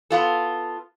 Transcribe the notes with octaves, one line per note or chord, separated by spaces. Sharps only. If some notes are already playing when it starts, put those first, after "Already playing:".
B3 F4 A4